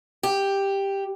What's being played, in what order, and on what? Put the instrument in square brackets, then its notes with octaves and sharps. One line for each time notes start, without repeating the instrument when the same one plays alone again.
[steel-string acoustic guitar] G4